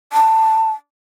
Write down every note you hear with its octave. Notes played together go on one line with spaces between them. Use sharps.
A5